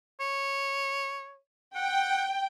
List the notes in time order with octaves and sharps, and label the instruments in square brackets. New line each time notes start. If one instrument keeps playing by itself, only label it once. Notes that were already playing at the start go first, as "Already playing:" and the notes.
[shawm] C#5
[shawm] F#5 [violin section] G5